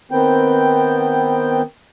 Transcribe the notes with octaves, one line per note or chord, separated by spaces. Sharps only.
D#3 B3 C4 G5